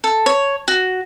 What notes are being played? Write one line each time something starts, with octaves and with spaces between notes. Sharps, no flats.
A4
C#5
F#4